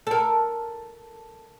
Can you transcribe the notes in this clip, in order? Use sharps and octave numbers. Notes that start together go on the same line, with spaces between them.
A4 A#4